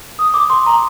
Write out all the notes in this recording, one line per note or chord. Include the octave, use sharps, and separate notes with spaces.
D#6
D6
C6
A#5